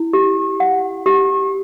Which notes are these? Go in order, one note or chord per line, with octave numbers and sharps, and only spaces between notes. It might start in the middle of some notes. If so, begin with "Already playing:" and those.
Already playing: E4
G4
F#5
G4